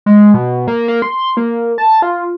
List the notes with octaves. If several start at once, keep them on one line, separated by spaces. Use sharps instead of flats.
G#3
B2
A#3
A#3
C6
A#3
A5
F4